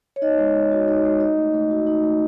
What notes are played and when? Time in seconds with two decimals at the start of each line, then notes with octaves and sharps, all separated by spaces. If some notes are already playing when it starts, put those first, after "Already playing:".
0.16 C#5
0.22 D#4 D#5
0.38 G#3
0.55 G#3
0.72 F#4
0.88 D#4
1.05 G#3
1.20 D#4 D#5
1.37 A3
1.54 A3
1.71 F#4
1.87 D#4
2.03 A3